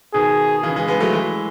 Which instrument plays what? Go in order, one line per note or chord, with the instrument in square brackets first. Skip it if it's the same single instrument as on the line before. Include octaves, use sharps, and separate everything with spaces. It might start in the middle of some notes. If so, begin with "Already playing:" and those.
[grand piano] B2 D#3 [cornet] G#4
[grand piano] C#3 E3
E3 G#3
G#3 B3
F#3 A3
E3 G#3